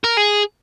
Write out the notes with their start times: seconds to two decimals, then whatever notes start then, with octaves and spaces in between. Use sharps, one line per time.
0.04 A#4
0.17 G#4